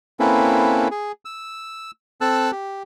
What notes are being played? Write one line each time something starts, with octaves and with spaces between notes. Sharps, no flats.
A#3 C4 C#4 E4 A4 B4
G#4
E6
C4 A4 A5 E6 F#6
G4